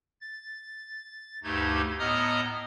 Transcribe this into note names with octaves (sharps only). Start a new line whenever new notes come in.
A6
D2 G2 A3 D#4 G4 G#6
A2 B3 D#5 A#5 D#6 F6